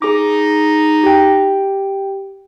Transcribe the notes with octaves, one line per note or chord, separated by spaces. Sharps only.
D#4 G#4 D6
G4 G5